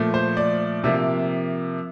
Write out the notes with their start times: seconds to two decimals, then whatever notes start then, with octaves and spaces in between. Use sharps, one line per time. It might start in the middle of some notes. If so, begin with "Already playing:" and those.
Already playing: A#2 F3 A3
0.14 C5
0.37 D5
0.84 C3 F3 A#3 E5